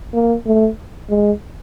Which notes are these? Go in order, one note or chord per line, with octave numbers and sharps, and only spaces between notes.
A#3
A3
G#3